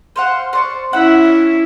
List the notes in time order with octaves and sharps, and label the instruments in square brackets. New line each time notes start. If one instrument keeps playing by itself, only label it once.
[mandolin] C5 F5 F#5
C5 D5 C#6
[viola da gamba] C#4 E4 [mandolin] E5 F#5
[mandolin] D4